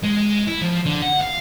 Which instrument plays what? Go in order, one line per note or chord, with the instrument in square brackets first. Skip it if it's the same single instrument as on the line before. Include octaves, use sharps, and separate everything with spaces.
[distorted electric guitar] G#3
E4
F3
D3
F#5
F5